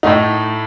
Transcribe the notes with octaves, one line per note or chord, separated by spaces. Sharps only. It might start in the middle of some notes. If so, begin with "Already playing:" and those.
A2 A3 D#4